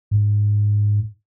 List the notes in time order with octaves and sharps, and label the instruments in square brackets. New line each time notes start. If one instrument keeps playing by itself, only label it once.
[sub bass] G#2